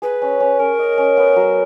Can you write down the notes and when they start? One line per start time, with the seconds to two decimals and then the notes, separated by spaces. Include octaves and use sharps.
0.02 G#4 B4
0.22 C#4
0.40 C#4
0.59 C#4 A#4
0.79 D#5
0.98 C#4
1.17 B3
1.36 F#3